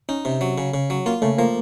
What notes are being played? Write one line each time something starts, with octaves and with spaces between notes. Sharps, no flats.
C#4 D#4
C3
F#3
C#3
C#3
F#3
A#3 F4
C#3 A3
F3 A#3